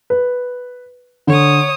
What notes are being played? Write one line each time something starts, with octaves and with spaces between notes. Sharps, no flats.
B4
D3 C#5 D#6